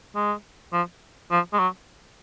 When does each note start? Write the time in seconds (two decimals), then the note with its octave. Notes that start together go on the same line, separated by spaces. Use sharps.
0.15 G#3
0.73 F3
1.31 F3
1.53 G#3
1.59 F#3